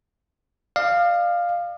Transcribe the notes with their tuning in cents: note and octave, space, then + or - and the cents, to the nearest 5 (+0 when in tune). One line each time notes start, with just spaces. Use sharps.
D5 +45 F5 +0